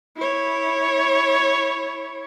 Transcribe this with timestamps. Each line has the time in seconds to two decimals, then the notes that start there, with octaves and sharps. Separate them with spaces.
0.17 E4 C#5